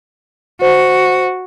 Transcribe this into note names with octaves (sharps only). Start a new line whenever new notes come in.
F#4 C5